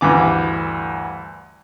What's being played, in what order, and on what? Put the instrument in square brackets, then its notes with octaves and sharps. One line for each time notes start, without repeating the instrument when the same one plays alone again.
[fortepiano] D2 G2 E3 D6